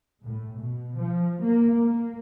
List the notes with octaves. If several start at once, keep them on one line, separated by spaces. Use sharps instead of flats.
A2
B2
F3
A#3
A#3